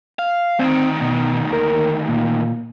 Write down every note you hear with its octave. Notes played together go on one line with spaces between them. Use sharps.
F5
D2 D#3 C4
B2
D#2 A#4
A#2